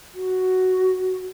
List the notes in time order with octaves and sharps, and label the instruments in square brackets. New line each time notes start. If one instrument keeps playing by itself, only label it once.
[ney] F#4